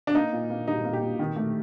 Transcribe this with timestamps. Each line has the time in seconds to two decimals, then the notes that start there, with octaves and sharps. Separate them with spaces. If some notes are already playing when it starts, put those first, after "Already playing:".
0.07 D4
0.15 A#3 D#4
0.33 A#2
0.50 A#3
0.67 G3 D#4
0.85 A#3
0.93 G4
1.02 A#2
1.19 D#3
1.36 A3